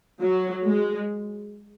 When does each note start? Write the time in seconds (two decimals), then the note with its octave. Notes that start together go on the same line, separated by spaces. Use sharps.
0.22 F#3
0.64 G#3